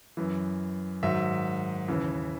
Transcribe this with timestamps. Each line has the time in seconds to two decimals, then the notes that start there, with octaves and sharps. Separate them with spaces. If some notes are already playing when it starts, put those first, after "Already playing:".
0.17 F#2 E3
1.03 G#2 D#3 F#3 E5
1.88 D#2 C#3 E3